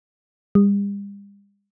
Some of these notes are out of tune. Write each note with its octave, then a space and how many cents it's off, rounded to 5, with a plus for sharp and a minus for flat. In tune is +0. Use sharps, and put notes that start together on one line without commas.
G3 +40